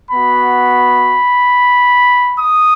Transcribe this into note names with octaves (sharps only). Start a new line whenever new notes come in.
B3 F#4 B5
D#6